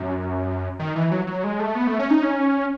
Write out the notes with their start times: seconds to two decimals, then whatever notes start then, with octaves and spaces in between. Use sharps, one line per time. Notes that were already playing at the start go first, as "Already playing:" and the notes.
Already playing: F#2
0.79 D#3
0.95 E3
1.11 F#3
1.27 F#3
1.44 G#3
1.60 A3
1.75 B3
1.87 A3
1.99 C#4
2.10 D#4
2.23 C#4